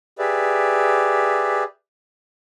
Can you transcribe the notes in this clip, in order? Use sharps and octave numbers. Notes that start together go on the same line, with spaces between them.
G4 G#4 B4 D5 E5